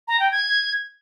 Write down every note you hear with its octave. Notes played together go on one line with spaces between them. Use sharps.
A#5
G5
G#6